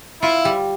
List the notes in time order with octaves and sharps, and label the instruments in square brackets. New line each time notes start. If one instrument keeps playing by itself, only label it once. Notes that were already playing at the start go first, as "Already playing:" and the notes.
[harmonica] E4 [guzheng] F4
[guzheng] G3